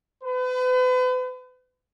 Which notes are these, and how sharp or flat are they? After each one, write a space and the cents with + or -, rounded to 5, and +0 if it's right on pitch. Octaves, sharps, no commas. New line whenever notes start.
B4 +40